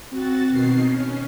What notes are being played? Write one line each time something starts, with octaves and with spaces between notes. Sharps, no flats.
C4 F#4 A6
B2 D#3 C7
C#4